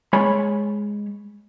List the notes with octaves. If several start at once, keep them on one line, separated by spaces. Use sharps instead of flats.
G#3 C#5 G#5 B5